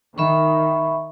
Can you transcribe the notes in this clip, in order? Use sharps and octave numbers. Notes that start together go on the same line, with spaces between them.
D#3 E5 B5 C#6